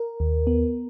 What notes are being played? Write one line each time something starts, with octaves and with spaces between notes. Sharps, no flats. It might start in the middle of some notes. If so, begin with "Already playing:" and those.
Already playing: A#4
D#2
B3